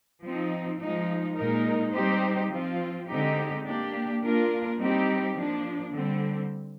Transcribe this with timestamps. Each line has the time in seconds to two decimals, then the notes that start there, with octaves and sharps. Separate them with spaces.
0.23 F3 C4 D#4
0.80 F3 G#3 D#4
1.37 A#2 G#3 D#4 A#4
1.94 G3 C4 D#4 G4 C5
2.51 F3 C4 F4
3.08 D3 G#3 C4 D#4 G4
3.65 A#3 D4 G4
4.22 A#3 D4 F4 A#4
4.79 G3 C4 D#4 G4
5.36 F3 A#3 D4
5.93 D3 G3 C4